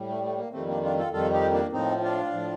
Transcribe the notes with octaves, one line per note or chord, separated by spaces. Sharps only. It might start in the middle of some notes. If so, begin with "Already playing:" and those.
Already playing: A2 G3
A3
A3
A#3
F2 D#3 G3 A3 C4
A#3 D4
D4 F4
F4 A4
F2 D#3 G3 F4 A4
D#4 G4
A#3 D4
A2 F3 C4 D#4
D4 F4
A2 F3